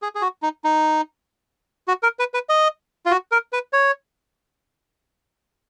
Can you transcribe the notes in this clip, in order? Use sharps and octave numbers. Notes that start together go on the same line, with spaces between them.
G#4
G#4
F#4
D#4
D#4
F#4
A#4
B4
B4
D#5
F4
F#4
A#4
B4
C#5